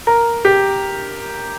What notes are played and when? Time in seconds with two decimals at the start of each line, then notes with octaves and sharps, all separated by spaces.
0.07 A#4
0.45 G4